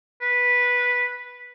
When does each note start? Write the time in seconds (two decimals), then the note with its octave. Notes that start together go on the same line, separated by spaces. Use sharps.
0.22 B4